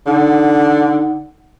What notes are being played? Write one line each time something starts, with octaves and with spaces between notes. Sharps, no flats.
D3 D#4 F#5